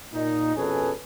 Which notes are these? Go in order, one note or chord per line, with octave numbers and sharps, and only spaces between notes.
A#2 D#4
F2 B2 C#4 G#4 A4 B4